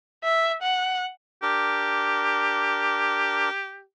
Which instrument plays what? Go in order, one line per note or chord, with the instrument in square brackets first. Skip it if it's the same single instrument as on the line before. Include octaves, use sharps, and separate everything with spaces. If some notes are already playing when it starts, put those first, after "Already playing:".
[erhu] E5
F#5
[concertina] D4 A#4 [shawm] G4